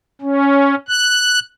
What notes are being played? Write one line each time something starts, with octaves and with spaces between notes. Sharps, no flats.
C#4
F#6